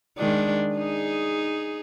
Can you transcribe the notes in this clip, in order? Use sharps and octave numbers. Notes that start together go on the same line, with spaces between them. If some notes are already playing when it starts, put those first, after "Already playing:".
D#3 G#3 D4
D#4 G#4